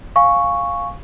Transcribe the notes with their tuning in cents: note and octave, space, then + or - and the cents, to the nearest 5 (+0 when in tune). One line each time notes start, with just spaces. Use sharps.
F5 +5 G#5 +0 C#6 +0